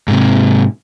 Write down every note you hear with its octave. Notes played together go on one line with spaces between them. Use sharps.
G#2 C3